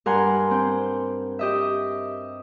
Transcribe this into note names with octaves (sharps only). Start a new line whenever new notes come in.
G2 A#4 F#5 G#5 C6
C4 G6
G4 D#5 E5